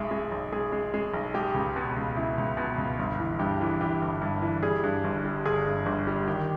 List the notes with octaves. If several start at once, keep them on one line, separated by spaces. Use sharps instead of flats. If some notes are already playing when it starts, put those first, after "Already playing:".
Already playing: B1 G#3 E5
G#3
B1
G#3 G#4
G#3
G#3
B1
G#3 G4
C#2
B2
C#2
C#2 E4
C#2
B2
C#2
G1
E3
G2 G4
E3
E3 G4
G1
G2
E3
G3 G#4
G2
G1
G3
G1 G#4
G2
G1
G3
D#3 G4